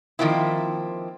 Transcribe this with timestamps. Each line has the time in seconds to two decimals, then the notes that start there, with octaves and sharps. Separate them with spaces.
0.19 D#3 F3 A#3 C4 E4